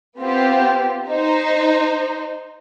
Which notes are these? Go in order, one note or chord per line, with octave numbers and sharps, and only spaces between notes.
B3 C4 F4 G4
D#4 C5